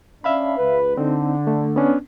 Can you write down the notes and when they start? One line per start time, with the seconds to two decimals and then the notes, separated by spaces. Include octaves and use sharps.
0.24 C#4 D4 E5 F5 B5
0.58 C#2 B4
0.97 D3 C4 D#4
1.47 A3
1.76 B3 C#4 D4